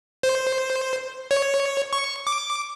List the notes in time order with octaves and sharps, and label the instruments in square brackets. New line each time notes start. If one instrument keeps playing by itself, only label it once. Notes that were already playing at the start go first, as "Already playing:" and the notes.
[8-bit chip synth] C5
C#5
C#6
D6